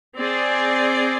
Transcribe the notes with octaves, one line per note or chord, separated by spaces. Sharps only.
C4 G#4 D5